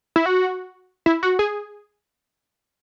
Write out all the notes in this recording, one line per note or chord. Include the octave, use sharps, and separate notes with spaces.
E4
F#4
E4
F#4
G#4